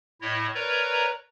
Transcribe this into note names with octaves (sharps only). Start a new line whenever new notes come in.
A2 E4 C#5 D#5
A#4 B4 C#5 D5 A#5